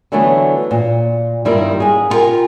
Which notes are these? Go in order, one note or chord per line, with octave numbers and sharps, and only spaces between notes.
D3 E3 F#3 A3 B3 E4
A#2
G2 D#3 G3 A#3 E4 F4
G#2 G#4
E4 F4 G4 A#4 G5 G#5